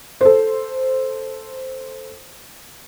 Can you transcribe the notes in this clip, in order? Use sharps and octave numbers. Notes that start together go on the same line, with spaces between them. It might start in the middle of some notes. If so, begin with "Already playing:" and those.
A4 C5